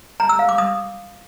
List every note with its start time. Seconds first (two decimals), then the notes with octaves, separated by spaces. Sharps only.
0.20 A#5
0.29 E6
0.39 F5
0.49 D6
0.58 D#6